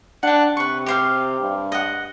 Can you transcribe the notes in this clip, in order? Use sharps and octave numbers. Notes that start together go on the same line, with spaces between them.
D4 F#5 G5
C3 B4 C#6
G4 C5 F5
G2
D#5 F#5